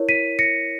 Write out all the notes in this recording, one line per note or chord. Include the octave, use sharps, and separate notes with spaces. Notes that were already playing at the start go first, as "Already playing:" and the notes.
Already playing: E4 A#4 C#5
B6 D#7
A#6 C#7